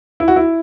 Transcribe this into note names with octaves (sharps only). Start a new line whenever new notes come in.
E4
F#4
E4